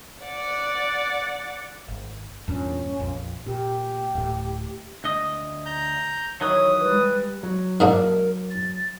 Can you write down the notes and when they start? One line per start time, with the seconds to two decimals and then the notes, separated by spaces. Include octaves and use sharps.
0.24 D5 F#5
1.88 G#1
2.48 E2 G2 A#2 C#4
2.99 A#1 F2
3.46 A#2 G4
4.15 D1 A2
5.04 D2 D#5
5.66 A#5 G6
6.41 D#3 E3 F#3 C#5 D#6
6.80 G3 G#3 B4
7.43 F#3
7.80 G#2 A#3 D4 A#4
8.50 A6